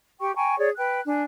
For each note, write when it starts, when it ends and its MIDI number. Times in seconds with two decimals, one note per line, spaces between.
0.20 0.34 67
0.20 0.34 79
0.20 0.34 85
0.36 0.57 79
0.36 0.57 80
0.36 0.57 82
0.36 0.57 85
0.58 0.69 68
0.58 0.69 73
0.58 0.69 74
0.76 1.00 71
0.76 1.00 79
0.76 1.00 90
1.07 1.22 62
1.07 1.22 80